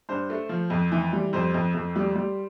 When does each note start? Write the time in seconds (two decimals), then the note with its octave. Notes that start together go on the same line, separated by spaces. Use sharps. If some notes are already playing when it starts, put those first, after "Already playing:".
0.09 G2 C5
0.30 A3
0.49 F3
0.70 F2
0.92 E3
1.13 G3
1.33 F2 C5
1.54 F2
1.74 F2
1.96 G3
2.15 G3